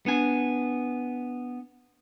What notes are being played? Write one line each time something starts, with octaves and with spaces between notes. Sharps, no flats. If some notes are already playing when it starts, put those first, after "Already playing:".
B3 D4 G#5